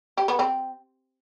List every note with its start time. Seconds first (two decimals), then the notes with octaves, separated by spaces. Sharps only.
0.18 G4
0.28 B3
0.39 C4